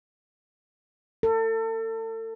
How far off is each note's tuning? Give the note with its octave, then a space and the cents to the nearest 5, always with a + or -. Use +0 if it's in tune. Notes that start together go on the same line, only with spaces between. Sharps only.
A4 +35